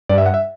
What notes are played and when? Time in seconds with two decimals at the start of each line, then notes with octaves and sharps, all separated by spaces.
0.09 G2 D5
0.18 E5
0.26 F#5
0.34 E5